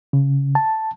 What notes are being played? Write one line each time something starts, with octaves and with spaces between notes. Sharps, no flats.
C#3
A5